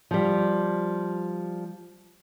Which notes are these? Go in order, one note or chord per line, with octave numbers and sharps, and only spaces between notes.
F3 G3